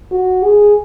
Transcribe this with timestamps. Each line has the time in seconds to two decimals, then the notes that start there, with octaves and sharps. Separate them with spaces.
0.12 F#4
0.44 G#4